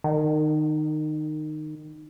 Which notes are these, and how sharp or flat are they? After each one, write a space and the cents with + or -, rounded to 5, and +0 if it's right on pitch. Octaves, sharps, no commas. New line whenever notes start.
D#3 -20